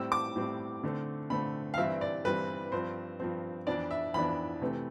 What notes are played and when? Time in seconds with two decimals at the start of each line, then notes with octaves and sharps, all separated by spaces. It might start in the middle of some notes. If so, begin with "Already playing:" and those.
Already playing: A2 G3 C4 E6
0.12 D6
0.36 A2 G3 C4
0.83 D3 A3 C4
1.30 D3 A3 C4 B5
1.74 F5
1.78 G2 E3 G3 C4 E5
2.01 D5
2.25 G2 E3 G3 C4 B4
2.72 G2 F3 C4 C5
3.20 G2 F3 C4
3.67 F2 E3 B3 D4 D5
3.91 E5
4.14 F2 E3 B3 D4 B5
4.62 C3 E3 A3 C4